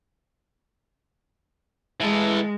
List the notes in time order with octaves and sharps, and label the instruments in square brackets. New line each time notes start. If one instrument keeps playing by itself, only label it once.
[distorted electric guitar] E3 A4 [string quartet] G#3